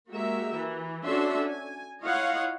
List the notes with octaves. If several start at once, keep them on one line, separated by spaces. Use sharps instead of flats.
G#3 A#3 F#4 G4 A#4 E5
E3
C#4 D4 F#4 A4 E5 C6
G#5
E4 F4 C#5 D#5 F5 F#5